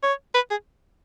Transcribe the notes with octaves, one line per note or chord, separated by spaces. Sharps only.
C#5
B4
G#4